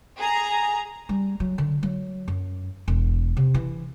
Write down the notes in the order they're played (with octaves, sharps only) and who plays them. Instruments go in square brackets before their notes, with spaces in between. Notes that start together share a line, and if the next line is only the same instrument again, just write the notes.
[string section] G#4 A#5
[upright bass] G3
F#3
D3
F#3
F#2
E1
C3
E3